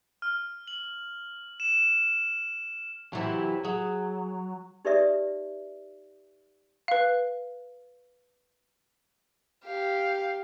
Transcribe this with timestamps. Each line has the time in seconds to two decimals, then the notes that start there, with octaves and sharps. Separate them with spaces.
0.22 F6
0.68 F#7
1.60 E7
3.13 C3 E3 F#3 C4 E4
3.65 F#3 G#4
4.85 D#4 G4 B4 D5 E5 D#6
6.88 B4 F5
9.64 G4 F5